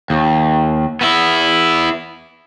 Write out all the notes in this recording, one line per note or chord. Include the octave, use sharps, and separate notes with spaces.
D#2
B3 E4